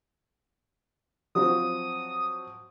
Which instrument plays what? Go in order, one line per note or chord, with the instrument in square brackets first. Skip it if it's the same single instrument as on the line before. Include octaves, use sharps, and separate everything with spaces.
[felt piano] F3 F#3 C4 [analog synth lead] D#6